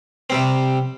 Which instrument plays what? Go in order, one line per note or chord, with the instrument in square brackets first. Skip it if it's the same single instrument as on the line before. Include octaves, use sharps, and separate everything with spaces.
[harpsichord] C3 G3 C4